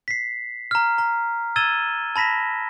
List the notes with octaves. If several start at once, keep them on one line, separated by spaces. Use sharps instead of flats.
B6 C7
A#5 F6
A#5
E6 G#6 A6 D#7 E7 G7
A5 B5 A#6 B6 E7